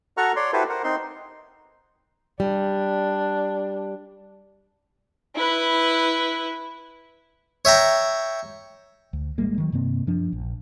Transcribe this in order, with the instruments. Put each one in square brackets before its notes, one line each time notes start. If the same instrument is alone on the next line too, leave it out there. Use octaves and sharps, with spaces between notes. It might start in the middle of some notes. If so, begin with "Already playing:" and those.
[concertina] F#4 A4 F#5 A#5 C#6 F6
C#5 D5 C6
E4 F#4 G4 A4 B4 C5
A#4 C5 F#5
C4 D#4 C6
[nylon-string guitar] G3 [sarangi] D4
[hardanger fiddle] E4 B4
[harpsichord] C#5 E5 G5 A#5
[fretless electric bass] D2
A1 G3 G#3 A#3
D#3 E3 F#3
G2 C3 A#3 C4
F#2 F3 D4
A#1